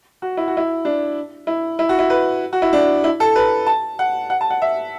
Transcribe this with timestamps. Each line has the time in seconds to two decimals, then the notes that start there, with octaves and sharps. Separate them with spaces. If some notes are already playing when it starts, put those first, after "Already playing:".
0.22 F#4
0.37 E4
0.48 F#4
0.57 E4
0.85 D4
1.47 E4
1.79 E4
1.89 F#4
1.99 E4
2.10 B4
2.53 F#4
2.62 E4
2.73 D4
3.04 E4
3.20 A4
3.35 B4
3.67 A5
3.99 F#5
4.30 F#5
4.41 A5
4.50 F#5
4.62 E5